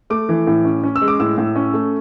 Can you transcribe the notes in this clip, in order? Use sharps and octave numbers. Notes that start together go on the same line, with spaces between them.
A3 D6
E3
A2
C#4
C#4
E6
G#3
D6
A2 E6
A2
C#4
A3